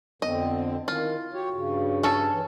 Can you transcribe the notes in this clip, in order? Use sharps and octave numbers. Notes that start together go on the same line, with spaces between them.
F2 D3 B3 C4 D#5
D#3 E4 F4
F#4 G4 C#5
G2 C#3
C#4 A4
E3